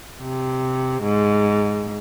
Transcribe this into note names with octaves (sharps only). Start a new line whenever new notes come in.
C3
G#2